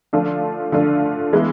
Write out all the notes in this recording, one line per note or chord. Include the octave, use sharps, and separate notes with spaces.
D3 F3 A3 D4 F4
D3 F3 A3 D4 F4
E3 G#3 B3 E4